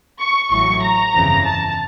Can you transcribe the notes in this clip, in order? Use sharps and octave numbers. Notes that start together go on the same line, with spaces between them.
C#6
A1 A2 F#3 C#6
A#5
G1 F2 C#3 E3
A5